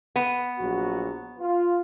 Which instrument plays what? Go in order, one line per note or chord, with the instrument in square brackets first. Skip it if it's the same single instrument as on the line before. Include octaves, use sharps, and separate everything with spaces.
[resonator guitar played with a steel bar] B3
[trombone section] A#1 F#3 F#4
F4